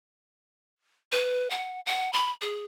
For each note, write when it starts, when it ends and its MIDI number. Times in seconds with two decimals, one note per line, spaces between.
1.12 1.50 71
1.50 1.80 78
1.86 2.12 78
2.13 2.31 83
2.42 2.65 68